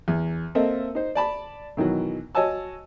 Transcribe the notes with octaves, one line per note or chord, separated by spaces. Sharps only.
E2
A#3 C4 A4 A#4 D#5 E5
D#4 C5
D5 A5 B5
B2 D#3 E3 F#3
F#4 C#5 D#5 G#5 A5 E6